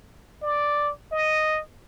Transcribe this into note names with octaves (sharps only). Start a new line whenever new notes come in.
D5
D#5